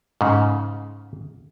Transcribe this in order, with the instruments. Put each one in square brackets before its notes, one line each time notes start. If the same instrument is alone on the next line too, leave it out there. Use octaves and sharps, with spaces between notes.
[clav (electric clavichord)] G#2 C#3